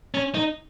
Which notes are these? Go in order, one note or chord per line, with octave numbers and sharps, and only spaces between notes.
C#4
D#4